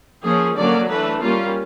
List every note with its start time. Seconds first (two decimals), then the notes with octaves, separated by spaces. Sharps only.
0.24 F3 A#3 C#4 G#4
0.56 D3 F#3 A#3 C#4 D5
0.89 E3 A3 D4 B4
1.22 G3 A#3 C#4 F4